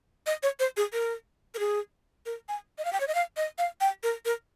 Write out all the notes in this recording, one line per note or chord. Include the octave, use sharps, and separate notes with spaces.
D#5
C#5
C5
G#4
A#4
A#4
G#4
A#4
G#5
D#5
F5
G5
C#5
D#5
F5
D#5
F5
G5
A#4
A#4